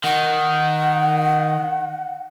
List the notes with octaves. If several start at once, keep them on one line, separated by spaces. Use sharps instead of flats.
D#3 F#5